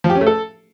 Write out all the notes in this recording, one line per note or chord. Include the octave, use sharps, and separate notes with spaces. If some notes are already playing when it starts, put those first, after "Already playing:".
F3
G4
C#4
A3
A4